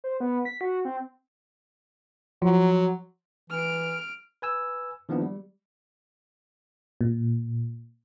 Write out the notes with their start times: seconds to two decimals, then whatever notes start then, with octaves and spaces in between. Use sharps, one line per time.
0.04 C5
0.20 B3
0.45 B6
0.61 F#4
0.85 C4
2.42 F3 F#3
3.50 E3 F6 D7
4.42 B4 G#5 E6
5.09 D#3 F3 A#3 B3 D4 E4
5.22 G3
7.01 A#2